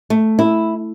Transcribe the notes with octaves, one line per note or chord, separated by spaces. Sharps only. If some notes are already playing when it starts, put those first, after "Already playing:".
A3
E4